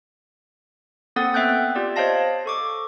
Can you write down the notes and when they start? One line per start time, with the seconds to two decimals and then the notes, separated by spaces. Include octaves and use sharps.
1.16 A#3 C4 A4 F#5 D#6 A6
1.34 B3 E5 G5 F#6 G6
1.75 F4 G4 D5
1.96 C5 C#5 D#5 F5 A5 A#6
2.46 A4 C#6 D6